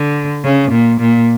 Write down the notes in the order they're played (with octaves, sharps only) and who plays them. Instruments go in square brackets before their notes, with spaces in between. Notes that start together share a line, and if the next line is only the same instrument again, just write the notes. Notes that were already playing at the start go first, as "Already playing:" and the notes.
Already playing: [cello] D3
C#3
A#2
A#2